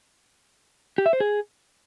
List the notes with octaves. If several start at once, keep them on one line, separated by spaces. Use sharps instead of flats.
G4
E5
C5
G#4